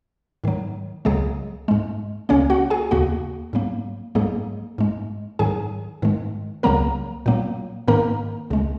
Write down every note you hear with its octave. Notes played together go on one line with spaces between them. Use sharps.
G#2 D#3 F#3
C#2 C#3 F#3 G#3 G#4
G#2 G#3
C#2 C#3 A#3 C#4 C#5
F#4 F#5
G#4 G#5
D#2 C#3 A#3 F#4 F#5
G#2 F#3 A#3
G#2 F#3 G#3 A#3 G#4
G#2 G#3
G#2 D#3 F#3 G#4 G#5
G#2 D#3 G#3
C#2 C#3 F#3 A#3 A#4 A#5
A#2 F#3 A#3
G#2 D#3 A#3 A#4 A#5
C#2 C#3 G#3